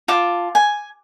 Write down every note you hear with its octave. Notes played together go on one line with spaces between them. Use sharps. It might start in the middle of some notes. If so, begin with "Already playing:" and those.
F4 A5 D6
G#5